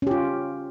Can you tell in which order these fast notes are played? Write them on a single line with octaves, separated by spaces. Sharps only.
C#4 G4 F4